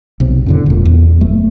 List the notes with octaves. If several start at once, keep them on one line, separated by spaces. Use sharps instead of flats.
B1 C3
F2 A2 D3
E1 A#2
E2
F#1 A3